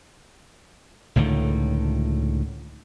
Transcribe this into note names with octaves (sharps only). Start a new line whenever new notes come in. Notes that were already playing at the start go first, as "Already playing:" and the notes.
C#2 A2 D3 D#3